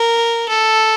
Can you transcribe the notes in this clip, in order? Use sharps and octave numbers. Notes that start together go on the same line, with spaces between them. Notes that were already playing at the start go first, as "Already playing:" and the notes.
Already playing: A#4
A4